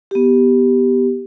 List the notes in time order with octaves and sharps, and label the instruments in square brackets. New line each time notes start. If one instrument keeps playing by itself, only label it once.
[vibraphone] B3 G4